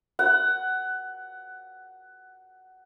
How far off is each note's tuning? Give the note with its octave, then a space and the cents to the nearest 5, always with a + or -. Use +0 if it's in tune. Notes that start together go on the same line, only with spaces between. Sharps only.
F#5 +15